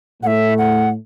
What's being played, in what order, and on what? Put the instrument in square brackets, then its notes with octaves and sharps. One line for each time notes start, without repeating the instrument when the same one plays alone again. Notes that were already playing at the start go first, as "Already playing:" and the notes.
[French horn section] A2 A3 [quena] E5 F#5
[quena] F#5